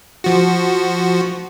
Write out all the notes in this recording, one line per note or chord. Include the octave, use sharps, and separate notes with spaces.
F3 F#4